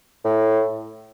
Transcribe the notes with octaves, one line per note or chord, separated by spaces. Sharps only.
A2